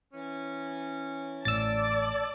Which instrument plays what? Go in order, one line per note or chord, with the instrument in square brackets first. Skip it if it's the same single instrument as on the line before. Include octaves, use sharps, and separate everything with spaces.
[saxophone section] E3 C#4
[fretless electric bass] A1 A2 [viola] D5 A5 [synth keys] E6 A6